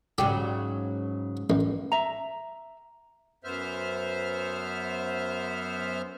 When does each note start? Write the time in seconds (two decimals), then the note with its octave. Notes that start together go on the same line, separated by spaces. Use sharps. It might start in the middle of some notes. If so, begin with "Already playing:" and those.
0.18 G#2 C#3 F#3 G4
1.50 A1
1.92 E5 A#5
3.44 F#2 B3 C5 E5 F6